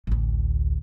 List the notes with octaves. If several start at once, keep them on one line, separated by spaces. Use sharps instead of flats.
A1 D2